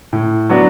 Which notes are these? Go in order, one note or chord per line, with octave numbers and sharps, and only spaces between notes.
A2
F#3 B3 D4 F#4